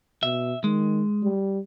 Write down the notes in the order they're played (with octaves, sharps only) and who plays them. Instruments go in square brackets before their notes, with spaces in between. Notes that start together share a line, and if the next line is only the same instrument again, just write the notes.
[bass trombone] B2 [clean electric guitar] E5
[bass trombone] D#3 [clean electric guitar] G#3
[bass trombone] G3